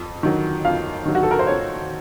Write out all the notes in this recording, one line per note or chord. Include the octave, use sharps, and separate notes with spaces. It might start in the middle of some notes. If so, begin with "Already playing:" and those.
Already playing: F2
D#3 F#3
F2 F5
D#3 F#3
F#4
A4
A#4
C5
F2 C#5